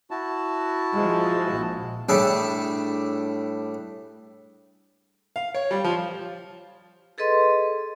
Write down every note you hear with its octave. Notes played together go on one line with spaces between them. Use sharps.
E4 F#4 A5
F3 G#3
A#1
A2 G3 D4 G#4 A4
F5
C#5
G3
F3
G#4 A4 B4 D#5 C6